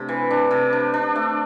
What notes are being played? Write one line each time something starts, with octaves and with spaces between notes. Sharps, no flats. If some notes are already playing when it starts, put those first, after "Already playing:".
Already playing: C3 A3 D4
E3
D4
C3
D4
D4
A3